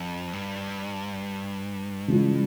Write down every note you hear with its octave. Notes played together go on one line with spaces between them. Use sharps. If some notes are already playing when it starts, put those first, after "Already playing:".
Already playing: F2
G2
C#3 E3 G#3 C#4 F4